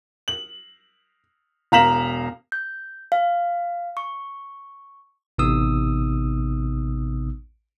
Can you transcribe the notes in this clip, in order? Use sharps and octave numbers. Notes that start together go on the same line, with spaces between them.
F#7
E1 F5 A#5 B6 E7 F#7
G6
F5
C#6
A1 C3 B3 D#4 D#6 E6